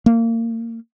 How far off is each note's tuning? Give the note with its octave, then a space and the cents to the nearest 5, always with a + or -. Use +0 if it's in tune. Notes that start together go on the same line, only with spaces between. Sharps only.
A#3 -30